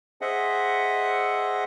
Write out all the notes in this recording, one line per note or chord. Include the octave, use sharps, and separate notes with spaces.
G#4 C5 D#5 E5 F#5